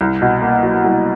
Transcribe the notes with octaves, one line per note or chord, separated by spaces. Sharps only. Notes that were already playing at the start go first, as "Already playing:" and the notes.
C2
B2
A#3
F#3
C2